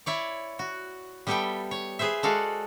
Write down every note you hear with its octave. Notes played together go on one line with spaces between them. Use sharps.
E4 C#5 D5
F#4
G3 B3 G4 A4 E5 G5
C#5
G#4 B4 C5 E5
G#3 F#4 A4 D5 F5